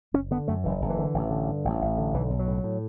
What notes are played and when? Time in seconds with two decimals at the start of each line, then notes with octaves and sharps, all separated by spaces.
0.14 F#1 C#4
0.31 D3 B3
0.48 F#2 A3
0.64 F#1 E3
0.81 F#1
0.90 E3
0.98 D3
1.14 A1
1.31 D3
1.47 G2
1.65 A1
1.81 A1
1.98 D3
2.14 B1 E3
2.30 B1
2.39 F#3
2.47 A2
2.64 A2